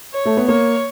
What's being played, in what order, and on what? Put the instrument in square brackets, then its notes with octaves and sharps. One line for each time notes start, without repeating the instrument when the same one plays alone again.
[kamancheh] C#5
[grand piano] A3
B3
[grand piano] A#3 [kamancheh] C#5